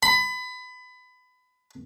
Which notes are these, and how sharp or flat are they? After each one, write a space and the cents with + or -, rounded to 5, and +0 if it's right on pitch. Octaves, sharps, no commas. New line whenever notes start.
B5 +25